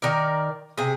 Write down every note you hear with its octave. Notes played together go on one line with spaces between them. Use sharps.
D#3 A#4 D5
C3 G#4